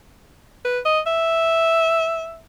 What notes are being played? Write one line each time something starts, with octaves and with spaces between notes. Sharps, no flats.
B4
D#5
E5